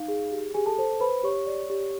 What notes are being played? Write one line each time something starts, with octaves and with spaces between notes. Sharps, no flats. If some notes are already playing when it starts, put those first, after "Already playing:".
Already playing: D#4 F5
G#4
G4
G4 G#4 G#5
A4 A5
A4 C5 A5
B4 C5 B5
G4 C#5 C#6
D5
G4